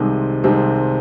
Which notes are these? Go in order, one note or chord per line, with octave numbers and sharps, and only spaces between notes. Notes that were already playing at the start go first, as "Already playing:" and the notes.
Already playing: C2 C3 D#3 G#3 C4
C2 C3 D#3 G#3 C4